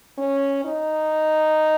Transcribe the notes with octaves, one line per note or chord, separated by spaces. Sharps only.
C#4
D#4